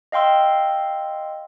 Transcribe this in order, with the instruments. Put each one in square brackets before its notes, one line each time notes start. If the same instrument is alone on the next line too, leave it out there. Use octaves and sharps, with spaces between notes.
[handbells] D#5 F5 G5 C6 E6